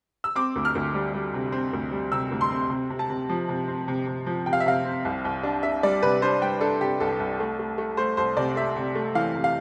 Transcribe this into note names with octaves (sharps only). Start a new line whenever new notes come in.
E6
C4 D6
D2
F6
D2
G3
G3
C3
C4
D2
G3
C3 E6
D2
C6
C4
C3
C3
A5
C3
F3
C3
C4
C3
C3
F3
C3 G5
F5
E5
C3 F5
C4
C2
C2
D4
D4 E5
G3 D5
C3 B4
D4 C5
G3 G5
D4 A4
C3 G4
C2 A4
C2
A3
A3
A3
A3 C5
C2 C5
C3 D5
A3 E5
C3
A3
E3 F5
C3
F5